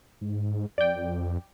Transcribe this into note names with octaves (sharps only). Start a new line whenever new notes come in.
G#2
F2 D5 G5